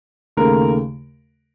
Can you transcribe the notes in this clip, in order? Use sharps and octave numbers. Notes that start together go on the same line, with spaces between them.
D#2 C#3 A3 A#4